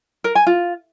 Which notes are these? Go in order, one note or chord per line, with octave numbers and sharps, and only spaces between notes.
A#4
G#5
F4